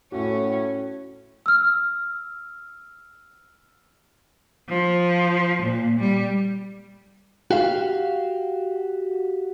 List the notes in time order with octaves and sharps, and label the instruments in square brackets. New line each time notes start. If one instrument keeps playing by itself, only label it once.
[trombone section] A2 [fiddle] C#4 [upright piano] F#4
[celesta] E6 F6
[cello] F3
A#2
G3
[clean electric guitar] F#4 G4 F5